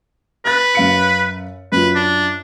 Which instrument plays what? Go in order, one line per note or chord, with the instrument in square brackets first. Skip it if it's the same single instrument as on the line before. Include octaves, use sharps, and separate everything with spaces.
[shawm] B4 [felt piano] F#6 A6
[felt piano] F#2 F5 C#7
[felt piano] F#2 F4 [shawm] B4
[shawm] D4